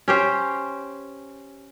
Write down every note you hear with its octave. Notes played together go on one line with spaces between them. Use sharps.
C#4 G4 C5